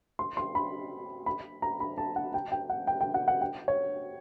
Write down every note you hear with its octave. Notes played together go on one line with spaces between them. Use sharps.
C6
C6
B5
B5
A#5
B5
A5
F#5
G5
G5
F#5
G5
G5
F#5
F#5
G5
C#5